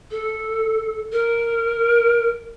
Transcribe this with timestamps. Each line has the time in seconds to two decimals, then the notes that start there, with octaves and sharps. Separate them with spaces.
0.11 A4
1.12 A#4